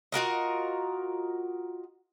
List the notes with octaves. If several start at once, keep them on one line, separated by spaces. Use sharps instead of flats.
F4 F#4 A#4 D#5